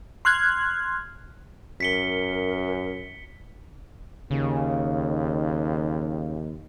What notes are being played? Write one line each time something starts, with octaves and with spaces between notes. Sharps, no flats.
C6 F6 F#6 G#6
F#2 A#4 B6 C#7 G7
D#2 C#3